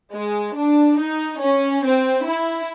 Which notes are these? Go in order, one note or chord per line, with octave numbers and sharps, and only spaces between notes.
G#3
D4
D#4
C#4
C4
E4